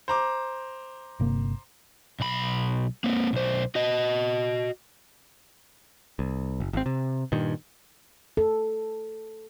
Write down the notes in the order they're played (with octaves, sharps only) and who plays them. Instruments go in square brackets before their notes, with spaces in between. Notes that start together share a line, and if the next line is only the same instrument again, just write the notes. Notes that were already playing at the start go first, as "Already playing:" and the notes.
[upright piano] C5 A#5 D6
[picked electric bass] G1 C3 A#3
[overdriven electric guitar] B1 B5
A#3 C4
B1 C5
F#4 D#5
[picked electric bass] C2
F#1
G#1 C4
C3
G2 A#2 D#3
[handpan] A4